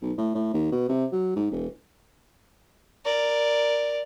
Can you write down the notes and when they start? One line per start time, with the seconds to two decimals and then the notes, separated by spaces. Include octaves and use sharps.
0.02 B1
0.18 A2
0.35 A2
0.54 D#2
0.72 B2
0.88 C3
1.12 F#3
1.36 G#2
1.51 E1
3.05 A#4 D5